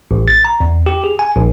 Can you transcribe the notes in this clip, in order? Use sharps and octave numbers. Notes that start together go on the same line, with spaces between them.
A1
A6
A#5
E2
G4
G#4
G#5
A#1